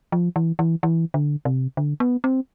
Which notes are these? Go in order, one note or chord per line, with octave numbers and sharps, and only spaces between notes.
F3
E3
E3
E3
D3
C3
D3
B3
C4